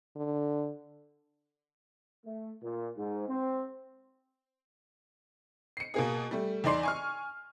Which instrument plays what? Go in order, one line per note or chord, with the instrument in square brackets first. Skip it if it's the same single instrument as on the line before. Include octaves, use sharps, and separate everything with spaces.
[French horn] D3
[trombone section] A3
A#2
G#2
C4
[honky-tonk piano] C7 C#7
B2 A#3 G#4
G3 A3
E2 D#4 D5 C6 C7
G#5 C#6 F6